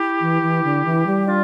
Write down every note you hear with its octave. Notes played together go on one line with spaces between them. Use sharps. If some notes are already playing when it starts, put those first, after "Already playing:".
Already playing: E4 G4
E3
E3
D3
E3
G3
D4 F4